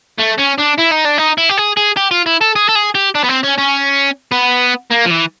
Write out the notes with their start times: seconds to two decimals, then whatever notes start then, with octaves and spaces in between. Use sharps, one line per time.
0.20 A3
0.39 C#4
0.59 D4
0.79 E4
0.92 D#4
1.05 D4
1.18 D#4
1.38 E4
1.49 G4
1.58 G#4
1.77 G#4
1.97 G4
2.11 F4
2.26 E4
2.41 A4
2.56 G#4
2.69 A4
2.75 G#4
2.95 G4
3.15 D4
3.24 B3
3.29 C4
3.43 C#4
3.58 C#4
4.32 B3
4.91 A#3
5.06 F3
5.11 E3